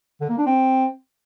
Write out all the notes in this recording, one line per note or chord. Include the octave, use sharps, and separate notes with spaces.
D3
A#3
D4
C4